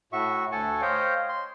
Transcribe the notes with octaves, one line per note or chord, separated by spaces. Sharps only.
A2 F#4 E5 C#6
D2 A4 F#5 G#5 A5 C#6
C5 C#5 D#5 F5 G5
C6